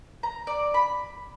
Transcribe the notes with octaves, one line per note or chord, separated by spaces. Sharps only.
A#5
D5
B5